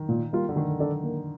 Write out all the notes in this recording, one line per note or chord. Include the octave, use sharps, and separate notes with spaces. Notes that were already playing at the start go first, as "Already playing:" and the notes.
Already playing: D#3
A#2
G3 A#3 F4
D3
D#3 A3
D4 A4 D5
A#3